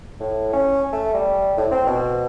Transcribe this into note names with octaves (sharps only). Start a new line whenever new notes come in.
A2
C#4
A3
G3
A2
C4
B2